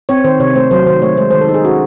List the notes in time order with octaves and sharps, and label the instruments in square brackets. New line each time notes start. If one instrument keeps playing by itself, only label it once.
[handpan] C4 C#5
D#3 C5
C3 C#5
A3 C5
F#3 C5
D#3 C5
A3 C#5
G#3 C5
D#3 C5
A4
D#4
G#4
C#4 F#4